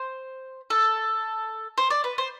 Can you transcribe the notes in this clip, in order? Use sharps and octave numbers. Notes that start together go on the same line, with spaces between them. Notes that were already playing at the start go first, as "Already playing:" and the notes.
Already playing: C5
A4
C5
D5
B4
C5